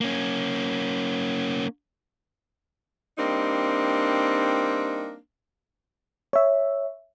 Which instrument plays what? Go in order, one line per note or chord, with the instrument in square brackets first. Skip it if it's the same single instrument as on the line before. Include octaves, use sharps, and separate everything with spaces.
[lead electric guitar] A#3 C#4
[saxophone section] G3 A#3 C4 D4 D#4
[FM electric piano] C#5 E5